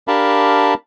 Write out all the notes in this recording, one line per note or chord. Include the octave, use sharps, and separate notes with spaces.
D4 G4 A#4 F5 A5 B5